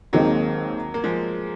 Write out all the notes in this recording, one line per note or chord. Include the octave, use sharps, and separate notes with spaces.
D#2 D#3 F#3 G#3 A#3 C4 D#4
A#3
F3 G#3